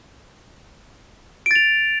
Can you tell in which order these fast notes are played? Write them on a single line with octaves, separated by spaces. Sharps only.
D7 A6 F7